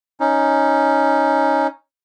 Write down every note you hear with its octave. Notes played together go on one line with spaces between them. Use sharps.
C#4 D#4